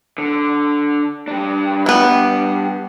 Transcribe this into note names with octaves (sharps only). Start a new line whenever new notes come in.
D3
G3 D4
B3 E4